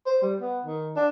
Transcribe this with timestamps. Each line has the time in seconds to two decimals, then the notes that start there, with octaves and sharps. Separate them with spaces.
0.06 C5
0.22 G3
0.41 B3
0.65 D#3
0.96 D4